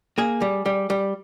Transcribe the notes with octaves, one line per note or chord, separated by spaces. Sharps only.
A#3 G#4
G3
G3
G3